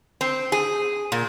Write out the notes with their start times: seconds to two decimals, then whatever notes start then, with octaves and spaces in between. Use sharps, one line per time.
0.21 C4
0.52 G#4
1.12 A#2